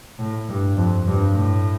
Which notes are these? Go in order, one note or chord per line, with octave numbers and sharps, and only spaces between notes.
A2
G2
F2
G2
A2